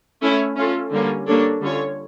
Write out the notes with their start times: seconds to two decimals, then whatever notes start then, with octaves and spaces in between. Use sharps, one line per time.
0.22 A3 C#4 E4
0.56 C#4 F4 A4
0.91 D3 G3 A#3 C#4
1.26 G3 A#3 D4 A4 C#5
1.61 D3 G3 C#4 F4 C#5